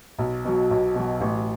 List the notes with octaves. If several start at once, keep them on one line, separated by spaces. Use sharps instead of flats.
B1
B2 F#3
B1
B2 F#3
A1